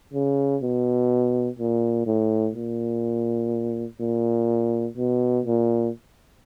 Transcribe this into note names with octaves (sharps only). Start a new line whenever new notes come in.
C#3
B2
A#2
A2
A#2
A#2
B2
A#2